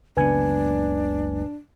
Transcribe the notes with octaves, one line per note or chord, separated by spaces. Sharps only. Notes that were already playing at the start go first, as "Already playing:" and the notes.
F#1 C#2 B3 D4 B4 G#5 G#6